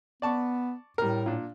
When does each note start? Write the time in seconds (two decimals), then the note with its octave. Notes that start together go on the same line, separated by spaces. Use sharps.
0.22 B3 D5 A5 C#6
0.98 A2 G3 A#4
1.26 A#2 D4